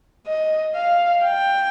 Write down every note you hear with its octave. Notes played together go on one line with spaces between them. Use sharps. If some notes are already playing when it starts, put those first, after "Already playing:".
D#5
F5
G5